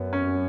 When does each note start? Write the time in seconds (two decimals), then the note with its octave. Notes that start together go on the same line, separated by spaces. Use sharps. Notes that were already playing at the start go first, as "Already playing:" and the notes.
Already playing: F#2 B3
0.13 C#4